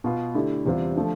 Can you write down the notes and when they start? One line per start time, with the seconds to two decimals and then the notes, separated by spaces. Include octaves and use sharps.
0.04 B2 B3 F4
0.35 D3 A3 E4 G4
0.65 E2 C3 G3 C4 F4
0.96 D3 F3 A3